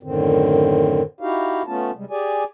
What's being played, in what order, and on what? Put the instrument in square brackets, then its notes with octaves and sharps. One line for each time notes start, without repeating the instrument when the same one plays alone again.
[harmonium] F#2 A2 D3 D#3 C4
D#4 E4 F#4 G4 F5
A3 B3 C#4 F4 A5
C3 G3 G#3
G4 G#4 D5 G#5